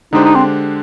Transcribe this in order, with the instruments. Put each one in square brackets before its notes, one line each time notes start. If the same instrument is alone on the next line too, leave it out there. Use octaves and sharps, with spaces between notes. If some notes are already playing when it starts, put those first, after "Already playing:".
[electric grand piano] D3 G#3 D4 G4 C5 [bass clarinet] D#4
[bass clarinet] D#4
C4